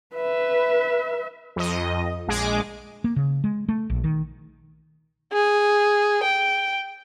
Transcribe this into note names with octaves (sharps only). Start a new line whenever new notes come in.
B4 E5
F2 D#5
A#1 G#3 G#4 D6
A#3
C#3
G#3
A3
A#1
D#3
G#4
G5